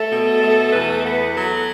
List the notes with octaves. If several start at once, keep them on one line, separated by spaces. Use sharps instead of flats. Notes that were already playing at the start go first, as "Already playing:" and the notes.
Already playing: A3 A4
B2
A3
E2 B4
B3 B4
F#3 A4